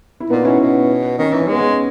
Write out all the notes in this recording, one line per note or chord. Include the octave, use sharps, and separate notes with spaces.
E4
A#2 B3 D#4
B2 C#4 E4
B2
D#3 C#4
E3 D#4
C#4
G#3 B3
C#4